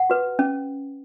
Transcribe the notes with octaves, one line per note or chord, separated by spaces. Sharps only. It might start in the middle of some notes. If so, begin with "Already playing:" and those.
Already playing: F#5
F#4 B4
C#4